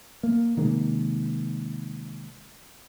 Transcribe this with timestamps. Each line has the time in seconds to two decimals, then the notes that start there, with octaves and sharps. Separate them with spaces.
0.23 A#3
0.57 C3 D#3 G#3 A#3